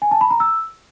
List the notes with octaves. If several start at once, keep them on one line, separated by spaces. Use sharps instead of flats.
G#5
A5
B5
A#5
E6